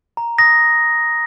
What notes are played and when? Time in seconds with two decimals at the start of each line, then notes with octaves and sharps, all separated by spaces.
0.17 A#5
0.38 D#6 A#6